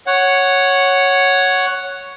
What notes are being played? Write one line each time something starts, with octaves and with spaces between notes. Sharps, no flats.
C#5 F#5